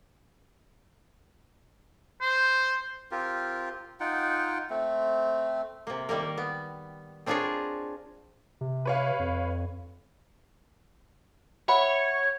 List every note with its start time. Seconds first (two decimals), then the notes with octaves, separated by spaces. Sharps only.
2.21 C5
3.11 C4 F4 G4 A#4
4.00 D#4 F4 F#5 G5
4.70 A3 C4
5.87 C3 A#3
6.09 D#3 G3 A#3 A#4
6.38 B3
7.26 C4 D4 F4 G#4 A#4 C#5
8.61 C3
8.85 B4 C#5 F5
9.19 F2
11.68 C#5 E5 F#5 B5